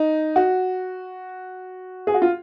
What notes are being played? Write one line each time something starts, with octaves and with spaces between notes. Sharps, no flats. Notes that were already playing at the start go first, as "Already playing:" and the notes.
Already playing: D#4
F#4
G#4
F#4
F4